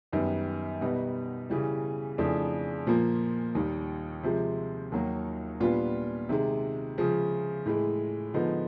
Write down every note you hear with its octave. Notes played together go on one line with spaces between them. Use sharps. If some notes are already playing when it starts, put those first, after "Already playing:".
F#2 D#3 G3 B3
B2 G3 B3 D#4
C#3 E3 G3
F2 C#3 E3 A3 D4
A#2 F3 A#3
D#2 D#3 G3
C3 F3 G#3
D#2 D#3 F#3 A#3
A#2 G3 B3 D4 F4
C3 D#3 G#3
C#3 F3 G#3
A2 E3 G#3
D3 F3 G#3 B3 D#4